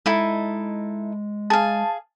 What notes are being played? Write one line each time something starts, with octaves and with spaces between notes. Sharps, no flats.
G#3 D#4 E4 A4
G#4 F5 A5